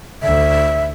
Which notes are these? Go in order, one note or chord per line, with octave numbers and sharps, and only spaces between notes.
D2 E5